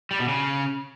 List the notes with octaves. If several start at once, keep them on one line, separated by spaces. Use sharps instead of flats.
G3
B2
C#3